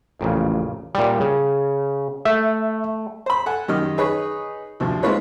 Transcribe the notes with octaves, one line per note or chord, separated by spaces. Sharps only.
A1 F2 A#2 C#3
A#2 G3
C#3
A3 E5
C5 B5
A4 F#5 G#5
F#2 D#3 G4 D#5 F6
D#4 G#4 B4 C#5
D2 G2 C3 F3
G#3 C4 D#4 F4 B4 C#5